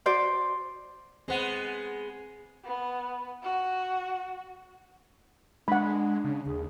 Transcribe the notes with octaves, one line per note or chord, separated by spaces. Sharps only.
F#4 C5 D5
G#3 B3 C4 C5 F#5
B3
F#4
G#3 D4 F#5 B5
C#3
D#2 G#4